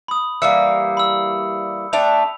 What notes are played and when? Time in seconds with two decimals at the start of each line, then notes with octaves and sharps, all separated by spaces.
0.08 B5 D#6
0.42 E3 G3 A#3 E6 C#7
0.97 B5 E6
1.93 A3 D4 G5 F7